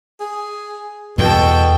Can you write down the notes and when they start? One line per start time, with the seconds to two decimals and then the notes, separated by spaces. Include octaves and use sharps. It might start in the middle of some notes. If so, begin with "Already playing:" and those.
0.20 G#4
1.18 E2 B2 A4 G5